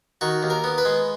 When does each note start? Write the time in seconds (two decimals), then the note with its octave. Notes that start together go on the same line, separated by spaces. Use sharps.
0.21 D#3 F#4
0.43 D#2
0.50 A#4
0.64 B3
0.78 B4
0.85 G#3